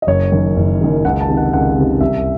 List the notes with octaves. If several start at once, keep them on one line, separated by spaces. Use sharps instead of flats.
D#5
F#1 C#5
F#2 D#3
F#1
F#2 D#3
C#2 F#5
A5
C3 D#3
F#5
C#2 F#5
C3 D#3
C2 E5